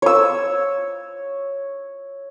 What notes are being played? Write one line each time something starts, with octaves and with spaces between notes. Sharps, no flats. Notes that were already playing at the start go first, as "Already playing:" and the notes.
C#5 E6